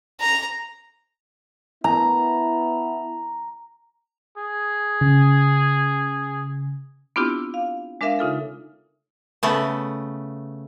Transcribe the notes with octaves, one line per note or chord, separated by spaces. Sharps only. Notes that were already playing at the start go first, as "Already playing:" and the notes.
A#5
B3 E4 A#5
G#4
C#3
B3 C4 D4 E4 F4 G4
F5
G#3 D4 A#4 E5 F5
C#3 D#4 F4 A4
C#3 A3 B3